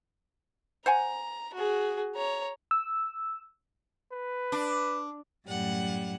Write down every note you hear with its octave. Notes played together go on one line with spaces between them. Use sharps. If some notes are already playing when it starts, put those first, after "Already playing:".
C5 F#5 G#5 A#5
F#4 G#4
C#5 A#5
E6
B4
D4
F#2 A2 G3 F#5